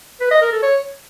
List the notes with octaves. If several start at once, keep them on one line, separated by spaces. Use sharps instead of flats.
B4
D#5
A#4
A4
C#5